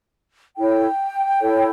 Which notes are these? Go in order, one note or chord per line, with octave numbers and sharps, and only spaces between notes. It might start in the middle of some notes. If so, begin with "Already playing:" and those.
E4 A4 C#5 G5
E4 A4 C#5